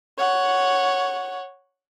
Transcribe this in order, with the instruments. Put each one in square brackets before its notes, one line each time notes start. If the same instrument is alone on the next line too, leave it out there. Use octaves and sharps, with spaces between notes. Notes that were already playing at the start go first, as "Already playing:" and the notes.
[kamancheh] C#5 F#5